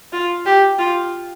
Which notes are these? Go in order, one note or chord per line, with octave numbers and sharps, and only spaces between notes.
F4
G4
F4